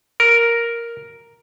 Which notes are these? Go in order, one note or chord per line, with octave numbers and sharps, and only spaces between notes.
A#4